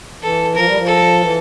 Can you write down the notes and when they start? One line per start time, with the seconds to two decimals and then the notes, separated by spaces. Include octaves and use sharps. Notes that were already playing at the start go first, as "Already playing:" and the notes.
0.22 E3 A4
0.55 F3 A#4
0.66 G3
0.76 F3
0.87 A4
1.20 E3